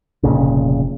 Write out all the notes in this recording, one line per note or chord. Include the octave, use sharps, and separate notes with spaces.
F1 C2 A#2 C#3